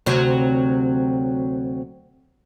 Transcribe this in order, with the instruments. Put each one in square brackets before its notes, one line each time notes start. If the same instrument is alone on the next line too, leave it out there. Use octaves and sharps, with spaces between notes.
[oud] D2 C3 F#3